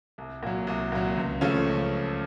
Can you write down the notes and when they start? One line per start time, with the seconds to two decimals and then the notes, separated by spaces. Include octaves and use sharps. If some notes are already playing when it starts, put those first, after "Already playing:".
0.18 C2
0.43 A#2 F#3
0.67 C2
0.92 A#2 F#3
1.17 C#2
1.41 C#3 F3 A3 C#4
1.66 C#2